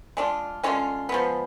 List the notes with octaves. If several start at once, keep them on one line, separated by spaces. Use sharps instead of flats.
G#3 D4 F4
D3 G#3 C#4 F4
F3 G#3 B3